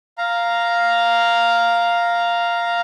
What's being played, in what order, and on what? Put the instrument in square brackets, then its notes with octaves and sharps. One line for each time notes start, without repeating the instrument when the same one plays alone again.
[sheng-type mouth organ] F5 A#5